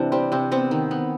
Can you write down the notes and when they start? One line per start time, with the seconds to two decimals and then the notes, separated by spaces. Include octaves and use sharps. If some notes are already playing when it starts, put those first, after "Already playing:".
Already playing: C3 E3 D4
0.12 G3 C4
0.32 C3 C4
0.51 B3 C4
0.71 D#3
0.91 B3